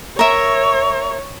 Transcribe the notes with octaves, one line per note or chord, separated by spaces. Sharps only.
A#4 C#5 E5